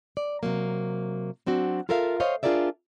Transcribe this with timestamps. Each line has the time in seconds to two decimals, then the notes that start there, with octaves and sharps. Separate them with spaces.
0.17 D5
0.43 C3 F#3 A#3
1.46 F#3 C4 D4 F#4
1.89 F4 A4 A#4 E5 F5
2.20 C5 C#5 D#5 F5
2.43 D4 F4 G#4 A#4 D5 E5